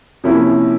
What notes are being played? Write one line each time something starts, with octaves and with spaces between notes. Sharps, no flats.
C3 F3 A#3 C#4 E4